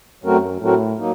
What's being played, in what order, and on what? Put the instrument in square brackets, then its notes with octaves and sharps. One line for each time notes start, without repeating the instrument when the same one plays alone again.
[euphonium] F#2 [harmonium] F#3 A3 C4 F#4 A#4
[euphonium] A2 [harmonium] F#3 A3 C4 F#4 A#4
[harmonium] F#3 A#3 D#4